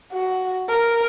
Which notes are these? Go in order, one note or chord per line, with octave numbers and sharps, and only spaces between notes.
F#4
A#4